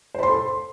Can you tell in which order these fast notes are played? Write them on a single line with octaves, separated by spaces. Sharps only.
C5 B5 C6 A4